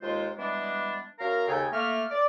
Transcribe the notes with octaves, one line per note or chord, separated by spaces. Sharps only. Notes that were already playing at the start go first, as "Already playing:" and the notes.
D#2 G#3 F4 C5
E3 G3 G#3 B3 D4
F#2 A#4 F5 A#5
D#2 C#3 A4 G5 G#5
A3 A#3 F6
D5